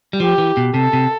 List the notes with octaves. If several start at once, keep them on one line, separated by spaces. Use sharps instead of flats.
G3
F3 G4
E3
B2
C3 A4
C3